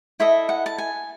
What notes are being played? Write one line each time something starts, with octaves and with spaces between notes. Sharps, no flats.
E4 A4 D#5 E5
F#5
A5
G#5